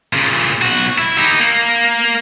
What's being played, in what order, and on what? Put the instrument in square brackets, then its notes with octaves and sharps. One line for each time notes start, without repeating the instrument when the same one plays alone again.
[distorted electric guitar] A#2 C#3
B1 F#4
E4
D#4 G4
A#3